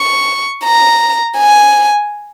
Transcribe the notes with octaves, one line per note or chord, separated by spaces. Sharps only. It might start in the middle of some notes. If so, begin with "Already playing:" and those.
Already playing: C#6
A#5
G#5